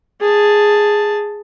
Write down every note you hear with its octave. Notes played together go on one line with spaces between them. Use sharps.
G#4 A5